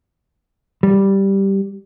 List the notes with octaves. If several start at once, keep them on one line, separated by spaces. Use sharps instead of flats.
G3